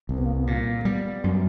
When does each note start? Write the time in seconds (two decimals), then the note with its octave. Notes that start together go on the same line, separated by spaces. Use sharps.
0.09 C2 C4
0.18 B3
0.25 A#3
0.32 B3
0.47 A#2 A#3
0.67 A#3
0.85 G3 B3
1.24 F#2